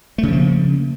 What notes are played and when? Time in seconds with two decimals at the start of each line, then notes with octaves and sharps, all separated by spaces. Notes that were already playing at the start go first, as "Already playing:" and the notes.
0.18 A3
0.23 C#3
0.28 F3
0.33 A#3